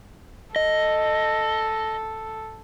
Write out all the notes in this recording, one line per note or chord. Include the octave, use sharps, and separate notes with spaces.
A4 D#5